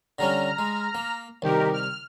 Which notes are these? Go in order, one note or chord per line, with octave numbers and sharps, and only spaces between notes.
D3 G3 C#4 A#5 F6
G#3
A#3
C2 D#3 G4 A#4
F6